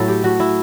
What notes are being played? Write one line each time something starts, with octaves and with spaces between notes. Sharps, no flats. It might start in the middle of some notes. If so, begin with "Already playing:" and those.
Already playing: A2 F#3 A3 E4 A4
G4
F#4
E4